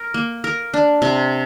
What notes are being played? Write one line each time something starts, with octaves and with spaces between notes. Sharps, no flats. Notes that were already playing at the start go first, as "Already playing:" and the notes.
Already playing: A#4
A#3
A#4
D4
C3